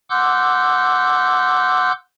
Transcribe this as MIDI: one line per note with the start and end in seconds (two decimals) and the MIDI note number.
0.10 1.92 78
0.10 1.92 84
0.10 1.92 86
0.10 1.92 88
0.10 1.92 90
0.10 1.92 91